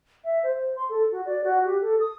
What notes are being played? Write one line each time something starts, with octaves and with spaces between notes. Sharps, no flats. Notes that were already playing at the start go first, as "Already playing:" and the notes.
E5
C5
C6
A4
F#4
D5
F#4
G4
A4
D#6